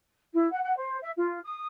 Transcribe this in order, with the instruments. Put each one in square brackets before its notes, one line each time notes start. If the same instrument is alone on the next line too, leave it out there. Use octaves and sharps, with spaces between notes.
[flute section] E4
F#5
F#5
C5
E5
F4
D#6